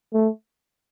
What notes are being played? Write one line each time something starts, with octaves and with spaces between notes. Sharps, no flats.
A3